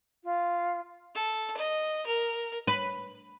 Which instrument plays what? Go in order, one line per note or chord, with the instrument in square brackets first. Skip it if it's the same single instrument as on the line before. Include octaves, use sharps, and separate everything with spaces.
[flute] F4
[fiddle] A4
D#5
A#4
[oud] B4